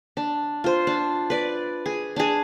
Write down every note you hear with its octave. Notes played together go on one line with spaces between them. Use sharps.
D4
F4 C5
D4
B4 D5
G#4
D4 G#4